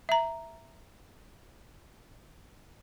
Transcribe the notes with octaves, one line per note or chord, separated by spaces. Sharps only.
E5 A#5